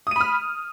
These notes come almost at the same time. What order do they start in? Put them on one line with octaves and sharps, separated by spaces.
D#6 D#7 B5 F6